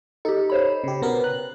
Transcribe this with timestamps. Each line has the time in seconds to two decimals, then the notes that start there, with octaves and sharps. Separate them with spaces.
0.25 D#4 G4 A4
0.50 C5 C#5 B5
0.84 C#3 G4
1.02 B2 B3 A#4
1.24 F#6